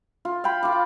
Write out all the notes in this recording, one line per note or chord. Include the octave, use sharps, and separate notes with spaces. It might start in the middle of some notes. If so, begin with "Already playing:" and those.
F4
F5 G5 B5
F4 D6